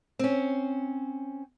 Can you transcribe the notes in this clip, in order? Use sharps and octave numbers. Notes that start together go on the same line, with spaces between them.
C4 C#4